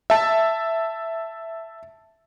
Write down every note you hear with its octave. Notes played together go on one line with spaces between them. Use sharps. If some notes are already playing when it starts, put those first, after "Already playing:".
E5 A5